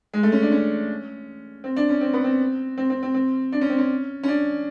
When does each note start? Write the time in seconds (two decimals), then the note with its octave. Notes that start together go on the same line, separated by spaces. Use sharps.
0.14 G#3
0.23 A3
0.32 C#4
0.42 D4
0.52 C#4
1.64 C4
1.76 D4
1.89 C#4
2.01 C4
2.14 B3
2.24 C4
2.78 C4
2.90 C4
3.03 C4
3.14 C4
3.52 D4
3.61 C#4
3.70 C4
3.78 C#4
4.23 C#4
4.28 D4